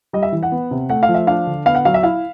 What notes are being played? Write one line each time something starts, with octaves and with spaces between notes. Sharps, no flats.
G3 D#5
E5
E3
F#5
B3
C3
A3 F#5
F5
F3
E5
D4 F5
D3
B3 F5
F#5
F#3 F5
E5
E4 F5